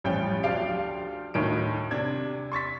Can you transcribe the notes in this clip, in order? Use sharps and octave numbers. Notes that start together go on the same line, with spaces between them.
A1 F3 G3 C#4 G5
D2 F3 D4 G4 F5 D7
D2 A2 D#3 D7
C3 D4 G#6
C6 C#6 A6 B6